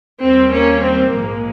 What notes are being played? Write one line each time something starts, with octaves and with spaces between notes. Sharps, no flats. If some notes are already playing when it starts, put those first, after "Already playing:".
D#2 D#3 G3 C4
A#3 C#4
C4
A#1 G#2 F3 G#3 A#3